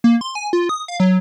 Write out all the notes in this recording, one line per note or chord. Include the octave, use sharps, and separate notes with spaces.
A#3
C6
G#5
F4
D#6
F5
F#3